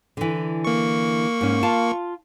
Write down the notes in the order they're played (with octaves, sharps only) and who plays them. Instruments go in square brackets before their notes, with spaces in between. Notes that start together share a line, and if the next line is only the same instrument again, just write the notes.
[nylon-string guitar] D3 E3
[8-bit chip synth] A#3 C#6
[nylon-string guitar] G#2 C#4
F4 F5 A5